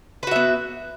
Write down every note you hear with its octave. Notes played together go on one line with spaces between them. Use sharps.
B3 F#4 B4 E5